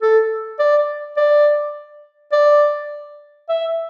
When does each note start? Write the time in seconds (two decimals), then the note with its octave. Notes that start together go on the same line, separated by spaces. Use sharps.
0.02 A4
0.59 D5
1.17 D5
2.32 D5
3.49 E5